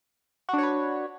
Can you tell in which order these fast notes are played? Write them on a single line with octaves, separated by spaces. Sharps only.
F#4 D4 C#5 B4